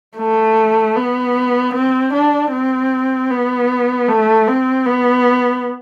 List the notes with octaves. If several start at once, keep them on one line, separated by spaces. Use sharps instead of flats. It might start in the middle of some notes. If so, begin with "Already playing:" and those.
A3
B3
C4
D4
C4
B3
A3
C4
B3